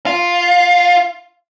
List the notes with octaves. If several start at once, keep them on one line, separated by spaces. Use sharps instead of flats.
F4